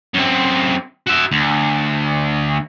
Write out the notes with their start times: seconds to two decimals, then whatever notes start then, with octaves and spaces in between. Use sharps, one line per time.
0.14 F#2 C4
1.07 F#4 E5
1.32 D2